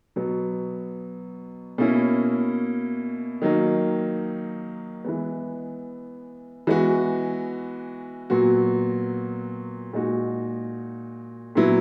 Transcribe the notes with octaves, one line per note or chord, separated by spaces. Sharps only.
B2 F#3 B3
B2 A#3 C#4 E4
D#3 F#3 A#3 D#4
E3 G#3 B3
E3 G#3 B3 F#4
A#2 F#3 B3 F#4
A#2 G#3 D#4 F#4
A#2 F#3 B3 E4